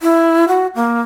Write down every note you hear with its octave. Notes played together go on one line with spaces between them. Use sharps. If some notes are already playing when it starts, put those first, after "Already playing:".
E4
F#4
A#3